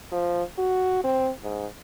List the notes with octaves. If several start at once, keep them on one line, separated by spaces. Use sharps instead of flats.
F3
F#4
C4
G#2